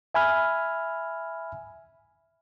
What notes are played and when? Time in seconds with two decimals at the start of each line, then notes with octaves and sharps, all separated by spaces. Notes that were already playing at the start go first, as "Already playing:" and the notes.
0.14 E5 G#5 B5 F6